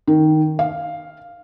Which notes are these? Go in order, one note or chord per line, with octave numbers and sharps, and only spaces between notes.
D#3
F5